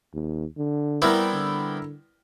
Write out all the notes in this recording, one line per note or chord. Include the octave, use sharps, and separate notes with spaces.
D#2
D3
G3 B3 C4 E4 A#4
D3